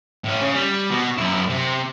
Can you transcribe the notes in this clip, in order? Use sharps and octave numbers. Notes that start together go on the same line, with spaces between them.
A2 C#4
C#3
G3
B2
F#2 E4
C3